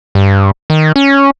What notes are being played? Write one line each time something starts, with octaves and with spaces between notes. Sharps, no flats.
G2
D#3
C#4